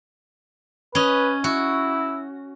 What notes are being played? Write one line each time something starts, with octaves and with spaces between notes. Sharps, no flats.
C#4 B4 D#5
E4 F#4